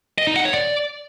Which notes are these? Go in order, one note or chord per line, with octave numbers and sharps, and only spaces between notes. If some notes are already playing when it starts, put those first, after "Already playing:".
D#5
D#4
F#5
C#5
D5